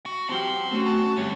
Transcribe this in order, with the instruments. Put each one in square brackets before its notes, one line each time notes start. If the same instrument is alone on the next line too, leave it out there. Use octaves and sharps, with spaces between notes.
[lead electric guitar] F#4
[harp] E3 F#3 F6 [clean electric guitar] C4 G4 [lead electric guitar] A5 C6
[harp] A3 [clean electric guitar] C4 C#4 [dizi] F#4
[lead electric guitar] A5
[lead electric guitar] D2 [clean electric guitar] G2 C#5 [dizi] G4